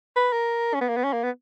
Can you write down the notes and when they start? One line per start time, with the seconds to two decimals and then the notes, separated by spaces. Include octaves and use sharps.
0.16 B4
0.33 A#4
0.74 C#4
0.81 B3
0.89 A#3
0.96 B3
1.04 C#4
1.13 A#3
1.23 B3